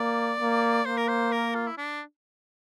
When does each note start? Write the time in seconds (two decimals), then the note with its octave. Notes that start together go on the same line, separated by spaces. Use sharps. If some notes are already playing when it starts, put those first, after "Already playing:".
Already playing: A#3 D5
0.40 A#3
0.86 A#3 C5
0.97 A#4
1.08 C5
1.32 A#4
1.55 F4
1.67 E4
1.78 D4